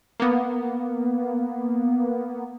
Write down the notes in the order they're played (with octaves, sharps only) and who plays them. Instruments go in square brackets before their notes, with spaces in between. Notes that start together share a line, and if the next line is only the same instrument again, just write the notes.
[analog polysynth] A#3 B3